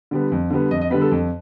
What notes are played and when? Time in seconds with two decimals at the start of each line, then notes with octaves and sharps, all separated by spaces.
0.11 D3 G3 B3
0.32 F2
0.50 D3 G3 B3
0.71 F2 D#5
0.81 D#5
0.90 D3 G3 B3 B4
1.01 A4
1.11 F2